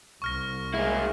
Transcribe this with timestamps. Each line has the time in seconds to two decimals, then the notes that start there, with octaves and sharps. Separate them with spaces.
0.22 C2 C#6 F6 A#6
0.74 G#3 A#3 E4